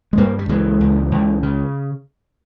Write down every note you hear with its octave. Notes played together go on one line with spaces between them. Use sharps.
G#3
G2 G3 A#3
G3
C#2 E3 G#3
C#2
C#2
C#3